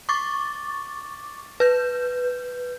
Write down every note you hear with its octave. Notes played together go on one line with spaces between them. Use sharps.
C#6 D6 A6
B4 G6